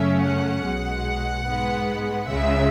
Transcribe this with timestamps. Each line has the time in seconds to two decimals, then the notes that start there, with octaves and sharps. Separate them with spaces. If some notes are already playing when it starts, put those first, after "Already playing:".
Already playing: F#2 C#3 F#3 A3 C#4 E5
0.23 F#5
0.65 B1 B2 G#3
1.46 G#2 G#3 B3
2.28 C#2 C#3 G#3 E5